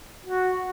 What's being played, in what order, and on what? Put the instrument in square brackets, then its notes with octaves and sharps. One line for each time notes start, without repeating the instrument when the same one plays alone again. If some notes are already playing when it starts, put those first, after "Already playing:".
[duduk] F#4